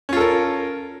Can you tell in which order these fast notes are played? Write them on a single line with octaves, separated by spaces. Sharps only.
C#4 F4 A4 A#4